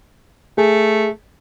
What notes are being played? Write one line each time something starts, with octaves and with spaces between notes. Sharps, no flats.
A3 G#4